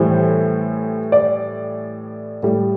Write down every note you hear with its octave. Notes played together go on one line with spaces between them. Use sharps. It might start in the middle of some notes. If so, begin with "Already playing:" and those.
Already playing: A2 E3 G3 C5
D5
A2 G3